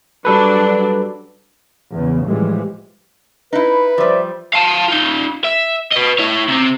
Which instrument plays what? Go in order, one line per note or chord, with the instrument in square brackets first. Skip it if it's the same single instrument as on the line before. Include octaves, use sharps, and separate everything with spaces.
[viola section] F#3 D4 [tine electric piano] G3 A4 B4
[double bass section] E2 C#3
A2 E3 F3 G3 G#3
[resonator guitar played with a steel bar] D#4 E4 [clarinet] B4
[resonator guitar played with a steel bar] F3 G3 [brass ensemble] C5 D5 E5
[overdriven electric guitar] F5 A5
D#4 F4
E5
B4 D#5
E4 C#5
C3 C4